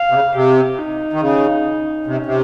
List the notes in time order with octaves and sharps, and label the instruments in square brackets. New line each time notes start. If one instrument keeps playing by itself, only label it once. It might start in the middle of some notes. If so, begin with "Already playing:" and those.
Already playing: [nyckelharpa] F5
[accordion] C3
C#3
[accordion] C3 [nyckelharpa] G4
[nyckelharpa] D#4
[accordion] D#3
C#3
[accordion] C3 [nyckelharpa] C#4
[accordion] C3